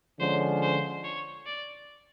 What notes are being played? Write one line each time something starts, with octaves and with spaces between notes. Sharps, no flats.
D3 F3 G#3 C#4 C5
C5
C#5
D5